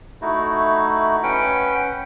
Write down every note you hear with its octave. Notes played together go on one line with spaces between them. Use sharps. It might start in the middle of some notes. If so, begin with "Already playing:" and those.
A3 D#4 E4 F#4
C#4 B4 F#5 G5